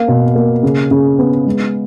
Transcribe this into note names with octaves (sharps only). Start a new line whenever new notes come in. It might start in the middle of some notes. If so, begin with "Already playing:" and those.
Already playing: A#3 F5
B2
A#3
C#3
C#3
B3
G#3